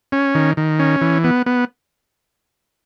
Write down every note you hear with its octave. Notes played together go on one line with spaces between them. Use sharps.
C#4
D#3
D#3
C#4
E3
B3
B3